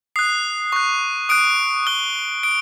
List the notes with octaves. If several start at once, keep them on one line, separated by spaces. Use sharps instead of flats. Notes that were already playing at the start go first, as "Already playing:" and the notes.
D#6 F#6 C7
C#6 F#6
D#6 F#6 D7
D#6 F#6 G7
D#6 D7